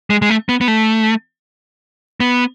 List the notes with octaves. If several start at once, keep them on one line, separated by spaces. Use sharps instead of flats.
G#3
G#3
A3
B3
B3
A3
B3